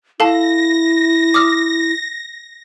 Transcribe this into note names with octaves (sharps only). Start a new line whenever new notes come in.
E4 A4 F5 A5 A#6
D6 D#6 F6